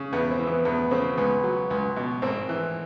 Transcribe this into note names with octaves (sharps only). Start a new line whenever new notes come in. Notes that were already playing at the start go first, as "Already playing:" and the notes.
Already playing: C#3
E2 B3
C4
E3
B3
E2 B3
C#3 C4
C#2 B3
F#3
C#2
B2
G#1 C4
E3